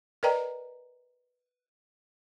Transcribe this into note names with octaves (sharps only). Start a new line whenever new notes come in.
A#4 B4 D5 D#5 G5 A#5